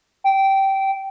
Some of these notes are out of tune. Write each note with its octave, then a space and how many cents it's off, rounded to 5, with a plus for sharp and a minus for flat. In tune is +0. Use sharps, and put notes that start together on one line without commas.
G5 -15